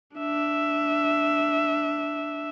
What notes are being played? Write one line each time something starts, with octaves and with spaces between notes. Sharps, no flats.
D4 E5